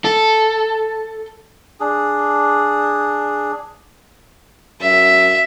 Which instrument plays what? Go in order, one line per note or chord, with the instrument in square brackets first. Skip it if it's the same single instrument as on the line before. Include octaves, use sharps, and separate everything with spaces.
[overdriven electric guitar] A4
[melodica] D4 G#4
[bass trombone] F#2 [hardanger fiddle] E5